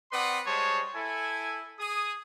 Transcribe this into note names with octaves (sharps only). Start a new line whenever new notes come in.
C4 B4 D5 F#5 C6 D#6
G3 G#3 G#4 C5 C#5 A5
E4 A4 G#5
G#4 D#6